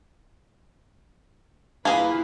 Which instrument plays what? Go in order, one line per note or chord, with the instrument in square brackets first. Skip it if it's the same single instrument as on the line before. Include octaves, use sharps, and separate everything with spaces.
[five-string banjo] A#3 G#4 [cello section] E4 F4 B4